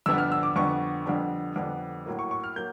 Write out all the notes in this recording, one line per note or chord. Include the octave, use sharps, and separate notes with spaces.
F2 D3 G3 B3 D4 E6
F6
E6
D6
F2 D3 G3 B3 D4 C#6
F2 D3 G3 B3 D4
F2 D3 G3 B3 D4
A2 F#3 A#3
C#6
C#6
F6
F#3 A#3 G6